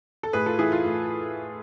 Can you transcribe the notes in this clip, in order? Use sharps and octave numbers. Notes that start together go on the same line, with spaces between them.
A4
A2 G#4 B4
F4 A4
E3 E4 G#4
F4
A2